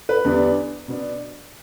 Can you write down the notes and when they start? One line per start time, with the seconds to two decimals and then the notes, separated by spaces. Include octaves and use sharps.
0.09 B4
0.25 E2 D3 G3 B3 D4
0.88 B2 B3 D4